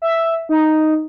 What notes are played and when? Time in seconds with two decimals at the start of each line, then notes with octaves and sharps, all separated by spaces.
0.02 E5
0.49 D#4